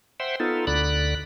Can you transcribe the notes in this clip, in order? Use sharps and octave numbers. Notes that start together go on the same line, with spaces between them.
C5 E5 F#5 G5 C6
B3 D#4 F4 A4
D2 D3 D5 B5 F#6